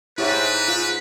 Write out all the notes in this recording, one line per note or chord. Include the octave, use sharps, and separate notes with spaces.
G#2 E4 G4 B4 C#5
F4